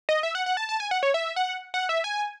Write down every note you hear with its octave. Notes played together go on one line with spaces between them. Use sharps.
D#5
E5
F#5
F#5
A5
A5
G#5
F#5
C#5
E5
F#5
F#5
E5
G#5